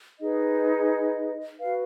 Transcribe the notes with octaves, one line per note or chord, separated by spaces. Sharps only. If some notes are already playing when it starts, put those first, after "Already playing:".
D#4 G#4 B4 D#5
F#4 B4 F5